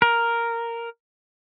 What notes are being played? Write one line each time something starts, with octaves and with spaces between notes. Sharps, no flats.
A#4